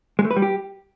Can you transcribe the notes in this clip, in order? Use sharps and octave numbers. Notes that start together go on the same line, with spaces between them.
G#3
A3
B4
G3
G4